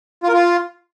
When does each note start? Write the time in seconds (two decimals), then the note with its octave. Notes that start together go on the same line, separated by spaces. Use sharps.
0.23 F4
0.28 A#4
0.33 F4